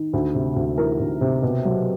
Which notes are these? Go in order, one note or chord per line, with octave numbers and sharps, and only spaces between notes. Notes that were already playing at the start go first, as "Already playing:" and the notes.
Already playing: D#3
D2
C3
D2
E3 A#4
D2
C3
B2
F#3